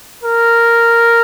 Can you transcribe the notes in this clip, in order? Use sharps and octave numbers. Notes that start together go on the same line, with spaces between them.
A#4